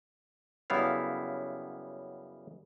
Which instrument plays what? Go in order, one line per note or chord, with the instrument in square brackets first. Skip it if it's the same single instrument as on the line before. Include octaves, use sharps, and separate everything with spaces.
[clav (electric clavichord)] F#2 C#3 G3 B3 E4 F5